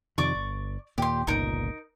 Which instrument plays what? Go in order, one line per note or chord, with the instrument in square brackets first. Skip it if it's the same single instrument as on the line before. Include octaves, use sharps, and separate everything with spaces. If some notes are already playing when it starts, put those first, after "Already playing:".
[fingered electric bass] F2 C3 D#3 [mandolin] D5 C#6 D6
[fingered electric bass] G1
[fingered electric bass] D#2 A#2 [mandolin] G4 C6
[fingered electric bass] G1 C#2 A#2 [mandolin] D#4 A#4